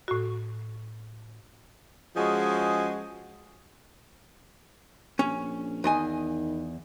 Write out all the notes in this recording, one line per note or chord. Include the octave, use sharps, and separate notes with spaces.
A2 F#4
F3 G#3 C#4 F#4 G#4 D#5
A#1 C#4
E2 D#3 D#5 G#5